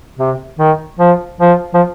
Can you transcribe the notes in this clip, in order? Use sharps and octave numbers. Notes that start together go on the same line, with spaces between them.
C3
D#3
F3
F3
F3